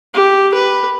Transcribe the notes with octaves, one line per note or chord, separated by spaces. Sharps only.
G4
B4